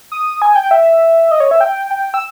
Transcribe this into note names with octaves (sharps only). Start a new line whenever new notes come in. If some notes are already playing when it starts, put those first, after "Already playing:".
D#6
G#5
G5
E5
D#5
C#5
E5
G5
G5
E6